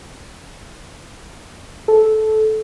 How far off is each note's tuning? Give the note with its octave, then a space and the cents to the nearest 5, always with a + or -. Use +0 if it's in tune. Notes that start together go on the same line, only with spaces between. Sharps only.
A4 -15